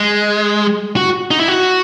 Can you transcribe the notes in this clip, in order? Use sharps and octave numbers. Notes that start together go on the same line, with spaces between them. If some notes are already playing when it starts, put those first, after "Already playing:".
Already playing: G#3
F#4
D#4
E4
F#4